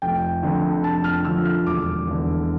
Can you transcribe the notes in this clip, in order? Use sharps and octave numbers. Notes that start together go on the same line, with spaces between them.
F1 G5
F2 D3 F3
F1 A5
F6
F2 D3 F3 E6
F6
E1 D6
E2 D3